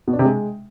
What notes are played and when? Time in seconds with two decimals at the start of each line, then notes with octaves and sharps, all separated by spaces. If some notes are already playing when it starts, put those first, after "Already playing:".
0.07 B2
0.13 D4
0.19 C3
0.25 G#3